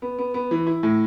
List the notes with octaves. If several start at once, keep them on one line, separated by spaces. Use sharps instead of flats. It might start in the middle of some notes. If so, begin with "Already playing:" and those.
B3
B3
B3
E3
E4
A2